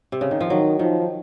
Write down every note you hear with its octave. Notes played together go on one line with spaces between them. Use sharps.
C3
C#3
D#3
F3
D#3 F#3
D#3 F3